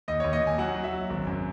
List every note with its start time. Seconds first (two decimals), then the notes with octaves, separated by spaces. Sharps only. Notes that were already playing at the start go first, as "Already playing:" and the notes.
0.08 D#2 D#5
0.20 C#5
0.24 D#2
0.33 D#5
0.41 D#2
0.47 G#5
0.58 F#3 F#5
0.75 F#3
0.84 E5
0.93 F#3
1.10 G#1
1.27 F#2